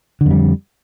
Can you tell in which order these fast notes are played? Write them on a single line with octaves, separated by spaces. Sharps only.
D3 F2 G3